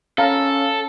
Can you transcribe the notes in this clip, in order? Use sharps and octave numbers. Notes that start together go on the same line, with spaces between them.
C#4 A4 F5 A#5